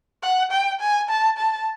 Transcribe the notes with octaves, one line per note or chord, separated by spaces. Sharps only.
F#5
G5
G#5
A5
A5